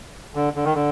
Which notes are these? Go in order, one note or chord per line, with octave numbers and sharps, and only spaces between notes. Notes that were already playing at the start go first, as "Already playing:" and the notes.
D3
D3
D#3
D3